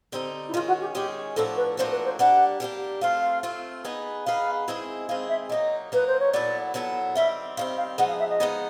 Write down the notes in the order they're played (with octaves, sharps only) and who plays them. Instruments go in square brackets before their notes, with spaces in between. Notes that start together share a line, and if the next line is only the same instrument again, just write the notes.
[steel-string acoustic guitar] D3 G3 C4 D#4
[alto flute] E4
[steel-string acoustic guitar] D#3 G#3 C#4 [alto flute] F4
[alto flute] F#4
G4
[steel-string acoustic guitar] D#3 G#3 C#4 [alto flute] G4
[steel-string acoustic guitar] A2 F3 A#3 D4 F#4 [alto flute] A4
[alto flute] B4
[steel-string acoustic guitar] A2 F3 A#3 D4 F#4 [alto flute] C5
[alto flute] B4
C5
[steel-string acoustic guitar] G3 A#3 D4 G4 [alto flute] F#5
[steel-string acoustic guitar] G3 A#3 D4 G4
[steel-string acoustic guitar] A3 C4 F4 [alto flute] F5
[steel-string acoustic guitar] A3 C4 F4
B3 D#4 G#4 B4
[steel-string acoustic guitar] B3 D#4 G#4 B4 [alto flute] F5
[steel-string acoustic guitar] D#3 G#3 C4 E4 G#4
[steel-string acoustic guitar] D#3 G#3 C4 E4 G#4 [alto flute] F5
[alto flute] E5
[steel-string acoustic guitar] F#3 A#3 D#4 [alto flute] D#5
[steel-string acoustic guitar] F#3 A#3 D#4 [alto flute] B4
[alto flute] C5
C#5
[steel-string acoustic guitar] A#2 F#3 B3 E4 A4 [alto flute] D5
[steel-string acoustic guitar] A#2 F#3 B3 E4 A4
[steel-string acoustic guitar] D#3 G3 C4 [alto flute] E5
[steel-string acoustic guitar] D#3 G3 C4 [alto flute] F5
[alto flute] F5
[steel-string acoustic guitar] F3 G#3 B3 D#4 [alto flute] F#5
[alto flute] F5
E5
D#5
[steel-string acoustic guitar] F3 G#3 B3 D#4